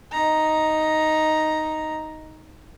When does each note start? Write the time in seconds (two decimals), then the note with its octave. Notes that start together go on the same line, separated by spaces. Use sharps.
0.12 D#4 A#5